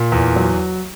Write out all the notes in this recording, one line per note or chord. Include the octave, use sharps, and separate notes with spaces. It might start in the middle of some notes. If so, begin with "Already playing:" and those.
Already playing: A#2
E2
F#3